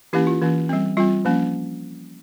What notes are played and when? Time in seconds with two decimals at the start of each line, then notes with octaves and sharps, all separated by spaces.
0.13 E3 A#3 C#4 E4 G4
0.27 F4
0.42 E3 A#3 C#4
0.69 G3 C4
0.97 G3 C4 F4
1.25 F3 A#3 C#4